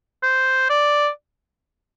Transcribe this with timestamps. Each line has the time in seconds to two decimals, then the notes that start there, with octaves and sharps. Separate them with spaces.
0.23 C5
0.70 D5